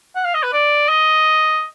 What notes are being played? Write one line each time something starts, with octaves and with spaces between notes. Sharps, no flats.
F#5
F5
D#5
B4
D5
D#5